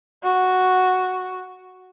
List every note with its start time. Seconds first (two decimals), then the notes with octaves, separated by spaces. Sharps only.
0.24 F#4